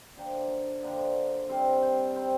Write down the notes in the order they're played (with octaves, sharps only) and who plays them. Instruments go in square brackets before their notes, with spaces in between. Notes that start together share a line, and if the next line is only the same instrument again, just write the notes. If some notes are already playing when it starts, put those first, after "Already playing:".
[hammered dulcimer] D3 F3 A#3 D4 G5
A5
D3 F3 A#3 D4 G5
C3 G3 C4 F5
G5
C3 G3 C4 G5